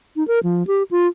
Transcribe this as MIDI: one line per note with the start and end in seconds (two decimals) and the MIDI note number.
0.16 0.26 63
0.28 0.39 70
0.43 0.66 53
0.67 0.83 67
0.91 1.07 65